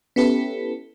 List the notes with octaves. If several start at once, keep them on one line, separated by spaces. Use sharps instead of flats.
B3 C#4 E4 G4 A4 B4